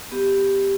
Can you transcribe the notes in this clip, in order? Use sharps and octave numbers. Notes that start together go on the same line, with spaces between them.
B3 G4